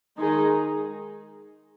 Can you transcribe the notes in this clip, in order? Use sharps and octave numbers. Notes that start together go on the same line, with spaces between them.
D#3 G#3 D#4 G#4